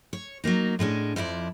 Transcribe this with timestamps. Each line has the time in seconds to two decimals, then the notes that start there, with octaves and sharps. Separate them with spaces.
0.13 C#5
0.44 F#3 G#3 A#3 D#4
0.79 A2 G#3 C#4 D4
1.16 F2 F3 E4 D5